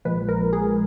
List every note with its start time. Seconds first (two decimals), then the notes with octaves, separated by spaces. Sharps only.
0.05 A#1 A#2 F3 G#3 B4
0.29 A#4
0.53 G#4